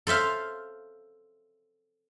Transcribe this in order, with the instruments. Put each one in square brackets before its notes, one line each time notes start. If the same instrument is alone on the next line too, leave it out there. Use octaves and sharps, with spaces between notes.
[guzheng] A4 C5 E5 F5